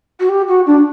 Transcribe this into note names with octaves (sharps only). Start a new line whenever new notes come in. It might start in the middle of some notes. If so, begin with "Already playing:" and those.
F#4
G4
F#4
D4